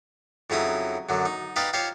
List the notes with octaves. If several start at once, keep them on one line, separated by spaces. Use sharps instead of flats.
F2 C#3 F#3 D#4 E4 D#6
F#2 D3 F#3
D#4
D#4 G4 B4 D5 D#5 F5
F4 G4 C5 C#5 F5